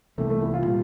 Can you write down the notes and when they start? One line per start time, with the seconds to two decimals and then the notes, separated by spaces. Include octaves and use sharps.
0.18 C2 C3 E3 A3 A#3
0.30 A3
0.42 E4
0.54 F4
0.66 A#2 G3